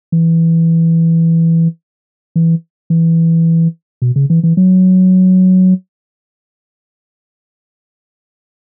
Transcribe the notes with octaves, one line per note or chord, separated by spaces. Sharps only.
E3
E3
E3
B2
C#3
E3
E3
F#3